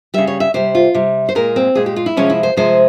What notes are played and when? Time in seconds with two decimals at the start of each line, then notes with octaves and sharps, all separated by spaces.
0.14 C#3 G3 E5
0.27 C#5
0.40 E5
0.54 C3 G3 C5
0.75 F4
0.94 C3 G3
1.29 C5
1.35 A#2 G#3 A#4
1.56 C4
1.75 A#2 G#3 G#4
1.86 G4
1.96 F4
2.06 E4
2.17 C3 F3 G#3 C#4
2.30 E4
2.43 C5
2.57 C3 F3 G#3 C5